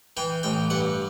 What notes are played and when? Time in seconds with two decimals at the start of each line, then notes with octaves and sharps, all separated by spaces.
0.17 E3 G5
0.43 A1 G5
0.70 G2 F#5